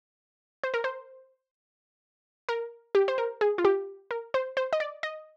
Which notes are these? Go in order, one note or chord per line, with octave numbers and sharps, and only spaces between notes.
C5
A#4
C5
A#4
G4
C5
A#4
G#4
F4
G4
A#4
C5
C5
D#5
D5
D#5